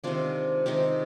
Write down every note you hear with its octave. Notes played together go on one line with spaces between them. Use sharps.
C3 D#3 G#3 C4 D4 F4
C3 D#3 G#3 C4 D#4 G4